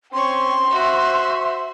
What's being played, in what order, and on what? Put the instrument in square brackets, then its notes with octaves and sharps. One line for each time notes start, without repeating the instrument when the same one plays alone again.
[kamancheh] C4 [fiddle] C#4 C#6 [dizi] C6
[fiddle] F#4 [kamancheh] C5 E5